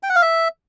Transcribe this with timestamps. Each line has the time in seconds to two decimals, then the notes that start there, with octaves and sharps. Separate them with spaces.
0.03 G5
0.09 F#5
0.16 F5
0.22 E5